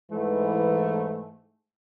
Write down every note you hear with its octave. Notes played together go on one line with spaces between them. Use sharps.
G#2 E3 A3